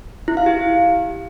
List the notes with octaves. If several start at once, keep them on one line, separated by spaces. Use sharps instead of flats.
E4
F5
G4